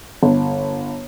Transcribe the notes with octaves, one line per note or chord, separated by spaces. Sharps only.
G1